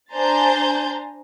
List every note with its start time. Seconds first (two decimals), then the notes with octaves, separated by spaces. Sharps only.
0.14 D4 C5 G#5 A#5 G6 A6